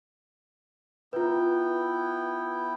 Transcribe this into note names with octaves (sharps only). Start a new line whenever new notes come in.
B3 E4 F4 B4 G5